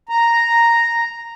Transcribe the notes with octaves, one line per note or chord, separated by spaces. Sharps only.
A#5